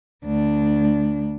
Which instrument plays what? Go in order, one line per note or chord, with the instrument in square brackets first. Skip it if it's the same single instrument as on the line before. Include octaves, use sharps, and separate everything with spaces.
[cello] D2 D4